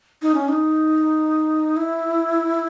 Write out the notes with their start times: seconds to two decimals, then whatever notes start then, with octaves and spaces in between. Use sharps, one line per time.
0.22 D#4
0.34 C#4
0.49 D#4
1.77 E4